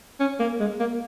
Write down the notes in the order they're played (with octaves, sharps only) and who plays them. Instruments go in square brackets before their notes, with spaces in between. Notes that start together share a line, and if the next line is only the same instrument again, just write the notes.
[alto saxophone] C#4
A#3
G#3
A#3